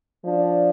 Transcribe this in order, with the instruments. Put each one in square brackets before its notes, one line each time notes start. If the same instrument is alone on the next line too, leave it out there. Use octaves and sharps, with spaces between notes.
[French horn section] F3 D4